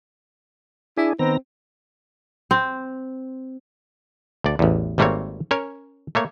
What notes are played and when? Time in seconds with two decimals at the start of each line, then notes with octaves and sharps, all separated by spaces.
0.98 D4 E4 G#4
1.19 D#3 B3 C4 A#5
2.51 C4
4.44 D2 D5
4.59 A1 E2
4.98 G#1 G3 A3 A#3 C4 C#5
5.51 C#4 A#4 C#5
6.15 A3 A#3 C#5